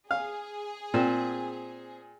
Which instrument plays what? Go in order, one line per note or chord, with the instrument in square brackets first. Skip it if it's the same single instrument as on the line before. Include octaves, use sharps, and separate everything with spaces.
[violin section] G#4 [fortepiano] F5
[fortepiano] A#2 [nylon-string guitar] C4